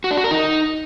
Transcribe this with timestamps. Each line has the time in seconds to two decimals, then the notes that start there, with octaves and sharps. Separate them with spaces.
0.04 F#4
0.11 D4
0.17 F#4
0.24 A#4
0.31 D#4